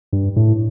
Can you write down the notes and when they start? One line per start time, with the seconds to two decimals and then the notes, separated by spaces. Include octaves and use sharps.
0.13 G2
0.36 A2